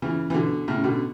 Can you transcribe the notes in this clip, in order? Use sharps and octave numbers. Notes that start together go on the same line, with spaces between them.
C#3 E3
E3
B2 D3
A2 C#3
B2 D3